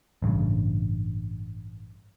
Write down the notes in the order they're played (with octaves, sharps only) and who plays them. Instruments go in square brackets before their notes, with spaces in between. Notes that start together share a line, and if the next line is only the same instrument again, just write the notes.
[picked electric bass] A1 G2 A#2 C#3